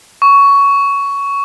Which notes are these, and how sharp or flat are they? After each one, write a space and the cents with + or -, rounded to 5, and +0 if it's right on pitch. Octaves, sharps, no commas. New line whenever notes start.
C#6 +15